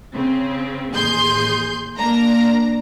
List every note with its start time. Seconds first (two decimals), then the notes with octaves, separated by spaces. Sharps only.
0.14 C#3 C4
0.91 A1 D#2 G#4 C6 G6
1.98 A#3 D4 A#5